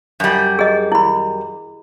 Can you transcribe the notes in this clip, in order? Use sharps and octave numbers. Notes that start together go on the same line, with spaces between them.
F#2 G3
G#4 D#5
E4 B5